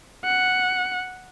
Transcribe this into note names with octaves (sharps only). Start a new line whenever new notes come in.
F#5